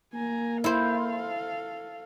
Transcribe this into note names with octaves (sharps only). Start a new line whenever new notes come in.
A#3 G#5 A#5
E4 A4 C5 F5